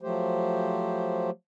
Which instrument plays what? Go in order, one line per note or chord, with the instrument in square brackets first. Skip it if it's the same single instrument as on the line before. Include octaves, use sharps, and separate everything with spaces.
[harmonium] F3 F#3 A3 G4 C5